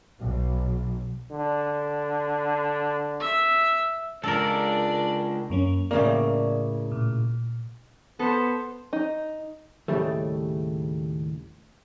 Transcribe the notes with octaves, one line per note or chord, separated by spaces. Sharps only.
B1
D3
E5
C#2 D4 A4 A#4 D5
F#2 A#3 C#4
A2 C#3 A#3 D5
A#2
B3 A4 C5
D#4
D#2 A2 C#3 G3 A3